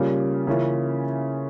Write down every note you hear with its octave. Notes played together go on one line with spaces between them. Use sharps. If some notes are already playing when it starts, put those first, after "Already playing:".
Already playing: C#3 G3 A#3 F4
C#3 E3 A#3 C#4 F4